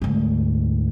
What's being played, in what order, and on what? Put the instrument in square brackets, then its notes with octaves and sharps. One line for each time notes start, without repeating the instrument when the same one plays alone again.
[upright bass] D2 G#2